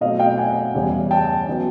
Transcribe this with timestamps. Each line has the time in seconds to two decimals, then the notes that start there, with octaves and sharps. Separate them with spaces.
0.01 B2 F#3 A3 C4 D#5 F5
0.19 F5 G5
0.38 F#5 G#5
0.75 E2 C#3 E3 G3
1.11 G5 A5
1.48 C#3 F#3 B3